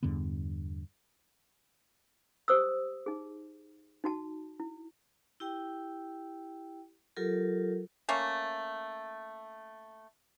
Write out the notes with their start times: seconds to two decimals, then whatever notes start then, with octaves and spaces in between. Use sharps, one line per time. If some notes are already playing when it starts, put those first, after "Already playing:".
0.03 E2 G2 D3 B3
2.48 G4 C5 D#6 E6
3.06 D#4 G#4
4.04 D#4 F#4 A5
4.60 E4
5.40 E4 G4 G5
7.16 F#3 F4 G4 A4 A#4
8.09 A3 A#3 C#4